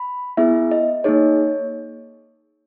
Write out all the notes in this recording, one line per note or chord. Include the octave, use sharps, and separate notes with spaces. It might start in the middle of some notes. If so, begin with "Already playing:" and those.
Already playing: B5
B3 E4 G#4 E5
D#5
A#3 D#4 G#4 C#5